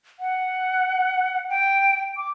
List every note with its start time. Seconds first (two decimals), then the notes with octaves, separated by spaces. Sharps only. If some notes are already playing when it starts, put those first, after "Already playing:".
0.20 F#5
1.50 G5
2.17 D6